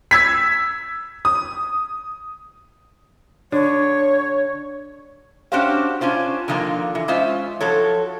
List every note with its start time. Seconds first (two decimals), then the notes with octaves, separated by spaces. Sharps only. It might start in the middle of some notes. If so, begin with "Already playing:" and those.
0.11 E6 G#6 B6
1.25 D#6
3.52 D3 C#5
5.52 C#4 D4 F#4 G4 C5 F5
6.01 C#4 D4 F4 C5
6.48 D3 D#3 F3 A#3 F4 A#4
6.95 E3
7.08 G#3 C#4 F4 C5 E5
7.61 F3 F#3 A4 C#5